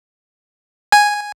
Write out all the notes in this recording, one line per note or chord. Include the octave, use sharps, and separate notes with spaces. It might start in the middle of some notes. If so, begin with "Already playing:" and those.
G#5